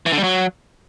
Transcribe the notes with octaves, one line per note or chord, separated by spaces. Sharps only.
E3
D3
G3
F#3